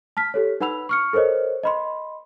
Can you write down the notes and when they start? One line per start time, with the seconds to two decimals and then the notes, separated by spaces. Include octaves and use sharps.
0.17 A5 F6 B6
0.34 G4 A4 C#5
0.61 D#4 B4 F#5 B5 E6 F7
0.89 C#6 F6 C#7
1.13 A4 A#4 C5 C#5 D#5
1.63 D#5 B5 C6